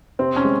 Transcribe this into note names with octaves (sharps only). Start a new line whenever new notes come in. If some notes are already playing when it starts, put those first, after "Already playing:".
C3 C4
C#4
G#3